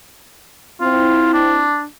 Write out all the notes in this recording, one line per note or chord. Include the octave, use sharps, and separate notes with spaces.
C4 E4 F4
D4